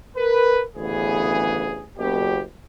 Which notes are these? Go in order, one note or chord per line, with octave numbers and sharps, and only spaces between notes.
A#4 B4
A1 D2 C#3 E3 B3 G#4
F#1 B2 G4